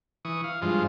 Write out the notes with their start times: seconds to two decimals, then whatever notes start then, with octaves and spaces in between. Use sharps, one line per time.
0.25 E3 C#6 D#6
0.44 F5
0.62 G2 F3 G#3 F4